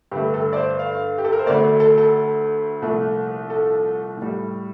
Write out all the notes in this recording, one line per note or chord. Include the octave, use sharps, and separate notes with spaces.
G2 D3 A3 G4
A4
D5
C5
F5
G4
A4
A#4
C5
D2 D3 A3 D5
A4
A4
C2 A#2 F3 A3
A4
A2 G3